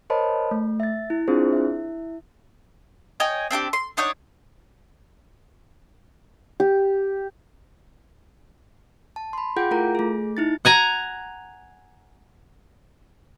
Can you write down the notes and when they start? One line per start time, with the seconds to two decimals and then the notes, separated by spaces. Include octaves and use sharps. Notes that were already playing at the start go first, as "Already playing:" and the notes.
0.10 A#4 C5 C#5 D#5 A5 B5
0.51 A3
0.80 E5 A6
1.10 E4
1.28 C4 D4 F4 G#4 C5
1.52 E4 E5
3.20 C#5 D#5 G5 G#5
3.51 C4 D4 E4 G4
3.73 C6
3.97 D4 D#4 C#5 F#5
6.60 G4
9.16 A5
9.33 B5 C6
9.56 F4 G#4 F#5 G5 G6
9.71 A3 E4 F4 A#4 A#5
9.95 A3 G#4
10.37 D#4 E4 A6
10.65 F#5 G#5 A#5